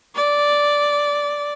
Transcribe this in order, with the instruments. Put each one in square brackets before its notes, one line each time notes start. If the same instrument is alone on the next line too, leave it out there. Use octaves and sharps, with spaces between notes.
[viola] D5